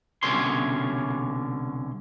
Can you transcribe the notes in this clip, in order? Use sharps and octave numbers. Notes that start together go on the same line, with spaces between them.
C2 B2 D3 C#4 C#5 C6